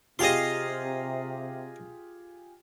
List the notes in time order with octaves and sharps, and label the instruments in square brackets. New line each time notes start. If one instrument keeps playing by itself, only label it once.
[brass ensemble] C3 [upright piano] F4 G4 G#4 [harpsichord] D#5 F5 C6